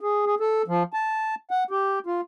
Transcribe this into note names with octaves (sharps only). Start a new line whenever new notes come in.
G#4
G#4
A4
F3
A5
F#5
G4
F4